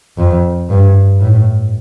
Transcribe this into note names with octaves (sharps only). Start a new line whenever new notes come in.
F2
G2
A2